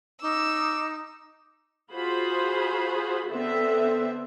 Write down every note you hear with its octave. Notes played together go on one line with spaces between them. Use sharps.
D#4 D6 E6
F4 F#4 G#4 C5 B5
D3 B3 C4 A4 E5